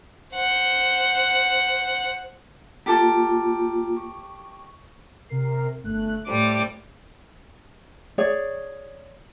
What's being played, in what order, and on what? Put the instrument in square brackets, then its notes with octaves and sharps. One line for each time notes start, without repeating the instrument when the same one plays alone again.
[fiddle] C5 F#5
[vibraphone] A#3 F4 [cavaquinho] G4 A4
[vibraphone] C#6
[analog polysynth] C3 A#4 C7
G1 A3 F#6
[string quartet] A2 G3 D6 [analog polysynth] A4 C5
[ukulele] G#4 C#5 D5